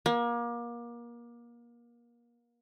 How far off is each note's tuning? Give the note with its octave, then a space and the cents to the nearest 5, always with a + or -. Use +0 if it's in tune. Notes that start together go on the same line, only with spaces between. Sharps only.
A#3 +30